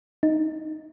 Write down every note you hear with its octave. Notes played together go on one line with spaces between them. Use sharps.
D#4